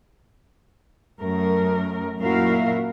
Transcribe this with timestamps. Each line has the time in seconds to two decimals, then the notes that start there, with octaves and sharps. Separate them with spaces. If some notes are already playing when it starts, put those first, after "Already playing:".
1.20 F#2 A3 A#4
2.18 F#2 A#2 E4 F#4 A#4 F5